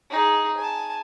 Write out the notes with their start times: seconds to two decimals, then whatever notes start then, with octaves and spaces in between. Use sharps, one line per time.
0.10 D#4 G#4
0.57 G#5 A5